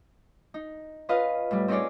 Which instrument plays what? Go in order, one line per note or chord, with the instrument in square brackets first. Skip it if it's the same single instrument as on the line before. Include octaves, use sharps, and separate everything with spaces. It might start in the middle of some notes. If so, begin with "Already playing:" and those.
[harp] D#4
C#4 F4 B4 D#5 F5
A2 G3
C4 C#4 D#4 G#4 C#5 D5